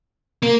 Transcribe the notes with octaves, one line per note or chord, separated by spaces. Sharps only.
A#3